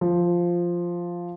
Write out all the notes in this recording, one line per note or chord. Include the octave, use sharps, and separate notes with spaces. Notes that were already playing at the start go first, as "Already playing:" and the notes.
F3